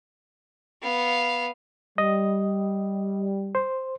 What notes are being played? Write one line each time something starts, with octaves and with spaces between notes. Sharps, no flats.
B3 F5
G3 D#5
C5